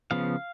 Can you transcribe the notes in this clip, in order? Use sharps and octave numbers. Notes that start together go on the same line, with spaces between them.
C#3 F3 B3 F5